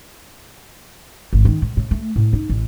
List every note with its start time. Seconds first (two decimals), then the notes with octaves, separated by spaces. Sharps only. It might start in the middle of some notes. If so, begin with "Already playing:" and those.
1.33 G#1
1.45 D#3
1.62 A2
1.77 A2
1.91 A3
2.16 A2
2.33 D#4
2.49 A1